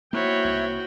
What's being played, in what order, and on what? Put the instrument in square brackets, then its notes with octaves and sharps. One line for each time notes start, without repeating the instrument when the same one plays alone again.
[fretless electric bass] A#3 [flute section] D#4 C5 E5 [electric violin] E4 C#5 [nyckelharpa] F#4 G5
[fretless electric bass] C2 A#3